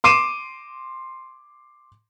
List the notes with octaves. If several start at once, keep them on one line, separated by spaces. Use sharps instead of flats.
C6 D6 C7 D#7 E7